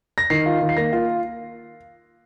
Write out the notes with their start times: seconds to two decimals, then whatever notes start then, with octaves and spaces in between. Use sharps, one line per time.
0.18 A#6
0.30 D#3 C7
0.46 F4
0.62 D#3
0.69 C7
0.77 A#3 A#6
0.93 F4